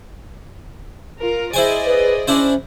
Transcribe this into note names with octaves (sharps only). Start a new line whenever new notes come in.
F4 A#4
E4 G#4 C5 D5 D#5 G#5
B4
C#4 D4 E4 C5